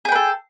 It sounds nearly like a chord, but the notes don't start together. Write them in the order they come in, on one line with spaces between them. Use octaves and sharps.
G#4 G5 B4 A4